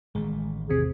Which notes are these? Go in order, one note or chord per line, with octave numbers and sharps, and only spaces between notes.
A1 D#3 G#3 A3
E2 C3 G#4